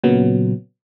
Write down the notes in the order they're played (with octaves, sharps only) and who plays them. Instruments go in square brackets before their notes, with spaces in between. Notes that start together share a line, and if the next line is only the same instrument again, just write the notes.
[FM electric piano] A#2 C#3 F#3 B3